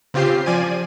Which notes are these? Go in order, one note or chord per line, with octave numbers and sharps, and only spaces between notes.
C#3 C4 F4 G4 C5 C7
F3 D5 G#5 D#7